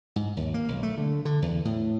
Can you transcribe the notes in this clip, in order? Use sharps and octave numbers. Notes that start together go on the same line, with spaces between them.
G#2
D#2
A#3
B1
A3
D3
D3
E2
A2